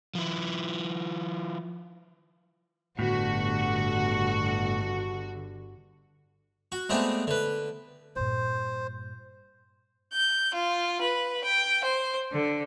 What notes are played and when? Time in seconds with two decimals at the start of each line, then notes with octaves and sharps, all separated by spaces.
0.15 F3 E4
2.99 G1 A2 D3 B3 F#4
6.72 F#4
6.89 G#3 A3 B3 C4 D4
7.27 D3 B4
8.16 G2 A#2 C5
10.12 G6
10.54 F4
11.00 B4
11.43 G5
11.84 C5
12.32 D3